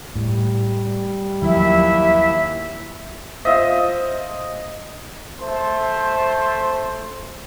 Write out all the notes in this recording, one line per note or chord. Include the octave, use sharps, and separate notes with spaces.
A2 G3
D#2 D#3 F3 F#3 E4 E5
F4 C5 D#5 E5
A3 C5